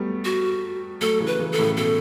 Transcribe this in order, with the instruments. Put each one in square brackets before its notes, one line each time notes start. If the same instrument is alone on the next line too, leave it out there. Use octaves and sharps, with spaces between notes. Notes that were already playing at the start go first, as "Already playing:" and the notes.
Already playing: [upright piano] F#3 G3 A3 B3
[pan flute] F#4
[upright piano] F#3 A3 [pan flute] A4
[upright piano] C#3 E3
[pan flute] B4
[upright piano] C#3 E3
[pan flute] A4
[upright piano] A2 C#3
[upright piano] B2 [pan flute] A4